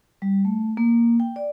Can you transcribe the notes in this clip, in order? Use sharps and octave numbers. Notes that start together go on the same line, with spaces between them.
G3
A3
A#3
G5
D5